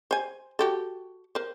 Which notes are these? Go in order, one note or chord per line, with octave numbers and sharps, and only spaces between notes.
C5 G#5
F#4 G4 A4
A#4 C5